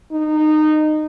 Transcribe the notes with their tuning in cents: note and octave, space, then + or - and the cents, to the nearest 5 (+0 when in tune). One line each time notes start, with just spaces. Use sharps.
D#4 -20